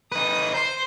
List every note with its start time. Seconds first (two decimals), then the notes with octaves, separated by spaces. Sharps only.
0.12 D#4 B4 D#6
0.54 C5 C6